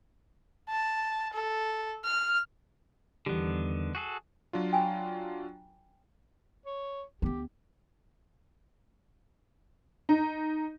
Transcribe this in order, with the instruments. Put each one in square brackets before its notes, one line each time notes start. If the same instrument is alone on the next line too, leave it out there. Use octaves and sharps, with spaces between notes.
[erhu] A5
A4
F6
[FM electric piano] E2 G3 [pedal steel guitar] D3 D#3 B3
[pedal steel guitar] F#4 G#4 A4
[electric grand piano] F#3 D4 F4
[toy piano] G5 G#5 B5
[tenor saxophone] C#5
[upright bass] D2 B3 [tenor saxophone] G4
[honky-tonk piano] D#4